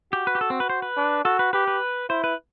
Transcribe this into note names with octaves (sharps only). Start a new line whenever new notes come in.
F#4 G4
B4
G4
A4
C4
B4
C5
B4
D4
F#4 A4
B4
G4 B4
B4
E4 C5
B4